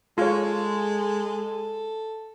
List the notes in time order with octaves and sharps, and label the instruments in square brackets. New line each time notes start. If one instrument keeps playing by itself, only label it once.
[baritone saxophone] G#3 [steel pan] F4 C#5 [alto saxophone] A4